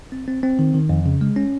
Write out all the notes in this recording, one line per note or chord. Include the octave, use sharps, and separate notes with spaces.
C4
C4
C4
D#3
D#3
F2
C#3
G#3
C#4